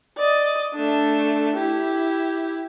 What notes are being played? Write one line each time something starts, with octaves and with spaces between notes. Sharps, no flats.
D5 D#5
A3 D4
E4 G4